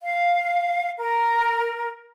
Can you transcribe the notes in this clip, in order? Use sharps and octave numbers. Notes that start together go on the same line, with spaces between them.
F5
A#4